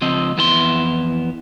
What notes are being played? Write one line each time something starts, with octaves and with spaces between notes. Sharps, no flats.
C#2 F3 C4 D#5
F2 E3 B3 E4 C5 C6